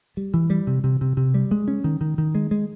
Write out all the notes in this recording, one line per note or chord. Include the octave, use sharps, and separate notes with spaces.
G3
E3
G3
C3
C3
C3
C3
G3
G#3
C#4
D#3
D#3
D#3
G#3
G#3